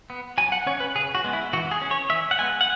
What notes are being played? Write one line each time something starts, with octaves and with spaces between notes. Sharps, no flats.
B3
F#3 G#5
F#5
C#4 C#5
B4
C#3 G#4
F#4
G#3 B3
E4
E3 F#4
G#4
C#4
C#5
E3 E5
F#5
G#3 B3 G#5
F#5